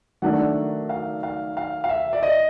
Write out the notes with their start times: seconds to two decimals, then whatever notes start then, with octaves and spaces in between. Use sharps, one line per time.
0.22 D#3 F#3 A3 D4 F#4 F#5
0.89 F5
1.23 F5
1.57 F5
1.84 F5
1.89 E5
2.13 D5
2.23 D#5